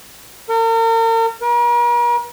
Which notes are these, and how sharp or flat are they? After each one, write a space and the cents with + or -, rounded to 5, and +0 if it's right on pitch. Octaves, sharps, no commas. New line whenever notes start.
A#4 -40
A#4 +45